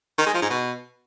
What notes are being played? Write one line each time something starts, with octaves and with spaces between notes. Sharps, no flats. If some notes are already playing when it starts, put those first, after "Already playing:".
D#3
G#3
F3
G#2
B2